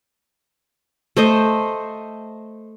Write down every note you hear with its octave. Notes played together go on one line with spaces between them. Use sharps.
A3 C5 D#5